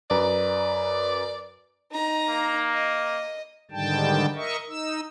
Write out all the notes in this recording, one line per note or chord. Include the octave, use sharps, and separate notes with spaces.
F#2 B4 D5 A#5
D#4 A#5
A#3
D#5
G#2 D3 D#3 G3 G5 A5
A#4 D#5 E5 C#6
D#4 E6